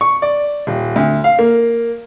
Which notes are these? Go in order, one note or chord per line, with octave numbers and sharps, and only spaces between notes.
C#6
D5
D#1
D2
F5
A#3